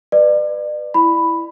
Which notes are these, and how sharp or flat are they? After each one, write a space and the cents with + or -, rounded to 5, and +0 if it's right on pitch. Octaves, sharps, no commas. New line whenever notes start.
B4 +10 D5 +35
E4 +5 B5 +5